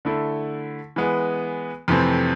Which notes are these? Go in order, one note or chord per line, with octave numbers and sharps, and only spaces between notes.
D3 A3 E4
E3 G#3 B3
F2 C3 E3 A3 C4